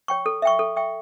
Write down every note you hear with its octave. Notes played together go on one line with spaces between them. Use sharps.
C#5 G5 C#6
A4
E5 G5 C#6
A4
E5 G5 C#6